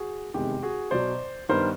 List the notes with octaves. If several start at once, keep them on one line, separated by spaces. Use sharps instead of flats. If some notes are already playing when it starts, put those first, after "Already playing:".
Already playing: F#4 G#4
F1 E2 C3 D#3 G#3 G4
F#4 G#4
B1 B2 F#3 C5 D5
G2 D#3 G3 B3 A#4 C5